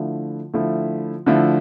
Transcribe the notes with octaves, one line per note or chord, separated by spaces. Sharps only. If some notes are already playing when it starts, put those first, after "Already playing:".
Already playing: D3 F3 A3 E4
D3 F3 A3 E4
D3 F3 A3 E4